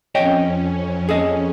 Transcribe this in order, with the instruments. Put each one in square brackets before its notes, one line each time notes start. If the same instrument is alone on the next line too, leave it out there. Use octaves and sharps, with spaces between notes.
[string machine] F2 C#4 [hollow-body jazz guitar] C#5 D#5 G5
[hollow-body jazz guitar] G#4 A4 D#5